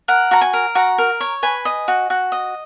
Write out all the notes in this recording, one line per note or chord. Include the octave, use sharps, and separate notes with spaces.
A#4 F#5
F#4 A#5
G#5
A#4
F#4 A#5
A#4
C#5
B4 G#5
D#5
F#4
F#4
D#5